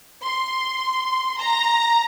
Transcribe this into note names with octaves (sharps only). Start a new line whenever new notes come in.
C6
A#5